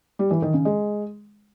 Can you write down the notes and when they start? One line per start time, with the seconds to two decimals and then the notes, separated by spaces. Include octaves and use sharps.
0.19 G3
0.31 E3
0.42 D#3
0.54 C#3
0.65 G#3